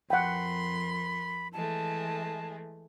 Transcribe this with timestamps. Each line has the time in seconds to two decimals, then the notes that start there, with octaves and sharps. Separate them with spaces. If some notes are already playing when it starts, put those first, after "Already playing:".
0.10 F2 A#4 F#5 G5 B5 C6
1.53 E3 G#3 A3 A5